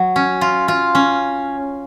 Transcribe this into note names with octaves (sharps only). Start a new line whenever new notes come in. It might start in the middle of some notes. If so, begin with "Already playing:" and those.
Already playing: F#3
C#4
F4
F4
C#4